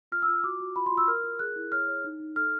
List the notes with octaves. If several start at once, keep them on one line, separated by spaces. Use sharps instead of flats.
F4 F6
E6
F4
F#4 D6
F#4
F4 B5
C6
F4
E6
A#4 F6
F4
G#4 F#6
E4
C#5 F6
C#5
D#4
D#4
A4 F6